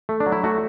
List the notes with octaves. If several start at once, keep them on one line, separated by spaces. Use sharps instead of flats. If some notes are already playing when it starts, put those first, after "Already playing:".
A3
D4
F#3
E4
A3 F#4